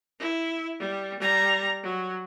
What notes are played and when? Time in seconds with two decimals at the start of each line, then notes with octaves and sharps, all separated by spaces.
0.20 E4
0.80 G3
1.19 G3 A#5
1.83 F#3